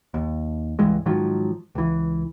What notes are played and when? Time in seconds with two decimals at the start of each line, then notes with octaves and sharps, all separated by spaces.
0.14 D#2
0.79 C#2 G2 E3 G#3
1.06 G#2 D#3 F3 F#3
1.75 C#2 E3